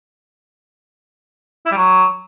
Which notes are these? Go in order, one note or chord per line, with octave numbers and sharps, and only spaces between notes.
E4
G3
F#3